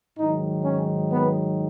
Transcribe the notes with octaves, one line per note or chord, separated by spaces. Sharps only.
G#2 D#3 F#3 D#4
C#4
B3